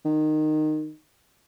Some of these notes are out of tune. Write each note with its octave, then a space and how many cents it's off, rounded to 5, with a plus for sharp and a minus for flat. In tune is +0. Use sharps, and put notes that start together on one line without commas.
D#3 -15